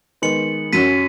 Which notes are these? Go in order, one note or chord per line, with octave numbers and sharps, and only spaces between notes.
D#3 G#3 B3 C#7 F#7
F#2 F#3 C#4 B6 D#7